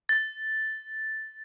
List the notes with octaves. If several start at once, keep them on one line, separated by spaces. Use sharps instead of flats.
A6